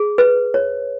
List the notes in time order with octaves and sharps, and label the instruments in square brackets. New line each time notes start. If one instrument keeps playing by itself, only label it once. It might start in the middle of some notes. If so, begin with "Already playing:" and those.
Already playing: [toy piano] G#4
B4
C#5